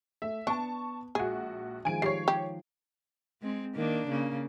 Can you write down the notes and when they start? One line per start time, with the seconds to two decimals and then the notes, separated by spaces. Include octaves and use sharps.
0.22 A3 E5
0.47 B3 D4 A5 C#6
1.15 A#1 G#3 F#4 G#4
1.85 D#3 F3 G#3 G#5 D7
2.02 G3 C#5 C7
2.28 G4
3.41 G#3 C4
3.75 D#3 A#3 D4
4.07 C#3 A#3